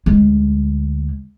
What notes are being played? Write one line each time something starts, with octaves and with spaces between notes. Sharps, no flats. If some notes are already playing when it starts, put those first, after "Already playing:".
D2 G#3